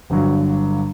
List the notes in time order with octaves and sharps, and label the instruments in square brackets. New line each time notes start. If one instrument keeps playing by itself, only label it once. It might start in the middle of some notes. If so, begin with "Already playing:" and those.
[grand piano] G1 G2 D3 F#3